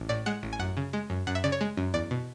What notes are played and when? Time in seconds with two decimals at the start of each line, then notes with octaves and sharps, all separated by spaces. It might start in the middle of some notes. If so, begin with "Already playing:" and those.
Already playing: A1
0.09 A2 D5
0.26 G#3 F#5
0.43 A1
0.53 G#5
0.59 F#2 F#5
0.77 C#3
0.93 G#3
1.10 F#2
1.27 F#2 F#5
1.35 E5
1.44 C#3 D5
1.52 C#5
1.61 G#3
1.77 F#2
1.94 E2 D5
2.11 B2